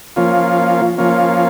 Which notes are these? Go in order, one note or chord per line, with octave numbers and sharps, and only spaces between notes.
F3 A#3 C#4 F4
F3 A#3 C#4 F4